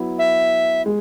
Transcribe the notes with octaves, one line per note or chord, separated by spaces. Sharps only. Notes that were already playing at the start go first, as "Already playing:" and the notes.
Already playing: F#3 B3 E4
E5
G#3